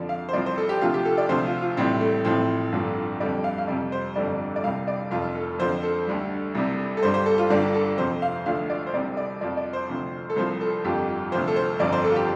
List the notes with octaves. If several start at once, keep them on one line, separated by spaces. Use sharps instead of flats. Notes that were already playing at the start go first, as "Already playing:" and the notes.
Already playing: F2 D3 F3 D5
F5
C5
C2 C3 F3 D5
C5
A4
G4
D2 C3 F3 F4
G4
A4
D5
D2 C3 F3 C5
F4
F4
A1 A2 G3 C4
A3
A1 A2 F3 C4
G1 G2 D3 F3
F2 D3 G3 D5
F5
F5
F2 C3 G3 D5
C5
G1 F2 D3 G3 D5
D5
C2 C3 G3 F5
D5
F1 F2 F3 F4
A4
F2 D3 F3 C5
A4
D2 D3 G3
C2 C3 G3
A4
G1 G2 G3 C5
C5
A4
F4
G1 G2 D3 G3 D4
A4
F2 C3 F3 C5
F5
D2 D3 F3 F5
D5
C5
C2 C3 G3 D5
D5
F2 F3 D5
D5
C5
D2 C3 F3
A4
C2 C3 F3 C5
A4
G1 F2 F3 G4
D2 C3 F3 C5
A4
C5
G1 F2 F3 D5
C5
A4
F4
G4